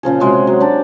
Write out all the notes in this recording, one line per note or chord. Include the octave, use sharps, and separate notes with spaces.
A#2 C#3 F3 G#4
C3 G#3 F#4
F#3
D4 G4 D5